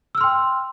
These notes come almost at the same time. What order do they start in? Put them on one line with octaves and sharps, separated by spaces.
E6 F6 C6 G5